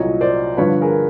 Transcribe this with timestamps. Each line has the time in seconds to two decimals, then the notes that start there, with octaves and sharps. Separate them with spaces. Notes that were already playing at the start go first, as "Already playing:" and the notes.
Already playing: C2 A#2 F#3 C#5 D#5
0.21 C5 D5
0.57 G2 D3 F3 B4 C#5
0.82 G#4 A#4